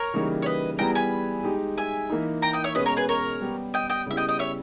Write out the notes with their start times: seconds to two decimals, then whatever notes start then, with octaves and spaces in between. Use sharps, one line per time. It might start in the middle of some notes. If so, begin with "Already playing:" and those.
Already playing: A#4 C#5
0.14 C#3 E3 G3 A#3 D#4
0.42 C#5
0.46 B4 D#5
0.79 G3 B3 E4 G#4 G5 A#5
0.95 G#5 B5
1.44 G#3 D#4 G4
1.78 E5 G#5
2.10 E3 A#3 D#4
2.42 G5 A#5
2.53 D#5 G5
2.64 C#5 E5
2.75 B2 G#3 C#4 B4 D#5
2.86 A#4 C#5
2.97 G#4 B4
3.09 A#4 C#5
3.41 G3 B3 G4
3.74 D#5 G5
3.90 D#5 G5
4.06 C#3 G3 B3 E4 E5
4.17 D#5 G5
4.28 D#5 G5
4.39 C#5 E5